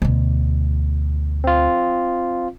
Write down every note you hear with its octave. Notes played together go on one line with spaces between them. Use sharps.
D2 B2
C4 F4